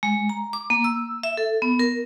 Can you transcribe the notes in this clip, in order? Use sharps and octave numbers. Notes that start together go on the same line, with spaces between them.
G#3
A#5
D6
A#3
E6
E5
A4
B3
A#4